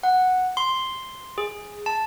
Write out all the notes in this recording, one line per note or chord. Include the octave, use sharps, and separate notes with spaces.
F#5
C6
G#4
A5